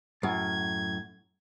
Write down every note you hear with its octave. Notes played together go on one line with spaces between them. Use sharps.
F#2 A2 G#6